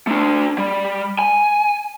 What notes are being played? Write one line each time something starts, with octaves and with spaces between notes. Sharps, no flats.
A3 D4
G3
G#5